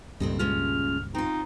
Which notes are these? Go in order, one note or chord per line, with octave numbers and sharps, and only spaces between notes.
C#2 G2 A#2 C4 A4 D#5
G#3 C#4 F4 F6
C4 D#4 F4